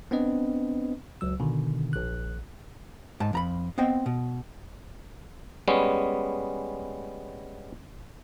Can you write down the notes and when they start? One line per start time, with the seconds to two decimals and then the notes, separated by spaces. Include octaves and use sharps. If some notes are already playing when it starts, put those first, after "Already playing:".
0.11 B3 C4 D4 B4 D#5
1.21 C#2 F#3 E6
1.40 B2 D3 D#3
1.93 A#1 F#6
3.20 G#2 A5
3.33 F2 A#5 B5
3.78 B3 C4 C5 D#5 G5
4.06 B2
5.68 G3 G#3 B3 C#4